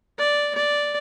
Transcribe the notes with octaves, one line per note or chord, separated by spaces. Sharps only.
D5
D5